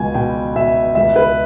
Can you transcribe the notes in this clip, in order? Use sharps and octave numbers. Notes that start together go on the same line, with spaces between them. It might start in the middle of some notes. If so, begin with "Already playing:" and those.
Already playing: C#2 B2 G#5
B2 G5
B2 E5
C#2 E5
B4